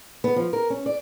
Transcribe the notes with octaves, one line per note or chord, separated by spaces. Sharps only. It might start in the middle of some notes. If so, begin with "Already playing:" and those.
B3
F3
A#4
C#4
D5